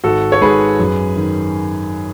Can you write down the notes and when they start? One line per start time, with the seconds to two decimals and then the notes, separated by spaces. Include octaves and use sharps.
0.04 G#1 F#4 A4
0.32 C#5
0.41 G#2 G#4 B4
0.79 F#2
1.17 D#3